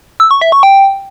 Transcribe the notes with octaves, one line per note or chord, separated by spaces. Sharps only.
E6
C#6
E5
C#6
G5